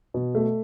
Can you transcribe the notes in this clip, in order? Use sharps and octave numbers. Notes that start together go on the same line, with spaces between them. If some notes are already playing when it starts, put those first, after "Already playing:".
B2
A3